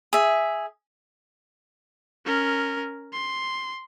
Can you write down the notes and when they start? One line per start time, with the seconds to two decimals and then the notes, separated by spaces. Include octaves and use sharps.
0.13 G#4 E5
2.26 C#4 A#4
3.13 C6